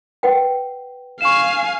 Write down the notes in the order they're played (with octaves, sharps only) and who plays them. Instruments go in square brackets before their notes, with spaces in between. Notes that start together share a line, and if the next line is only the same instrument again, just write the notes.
[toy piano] B4 F#5 G5
[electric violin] F5 G#5 [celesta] C#6 E7